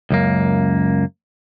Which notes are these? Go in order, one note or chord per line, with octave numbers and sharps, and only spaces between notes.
C#2 F#2 A#3